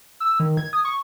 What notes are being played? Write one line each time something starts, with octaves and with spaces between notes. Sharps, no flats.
E6
D#3
G#6
D#6
C#6